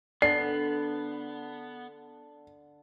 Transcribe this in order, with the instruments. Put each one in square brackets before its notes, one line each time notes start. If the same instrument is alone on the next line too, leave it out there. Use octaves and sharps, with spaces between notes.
[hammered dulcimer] D3 [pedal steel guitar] B3 [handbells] D5 [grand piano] C7